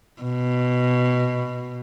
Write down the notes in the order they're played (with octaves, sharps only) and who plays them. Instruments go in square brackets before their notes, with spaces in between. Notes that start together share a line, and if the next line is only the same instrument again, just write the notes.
[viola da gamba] B2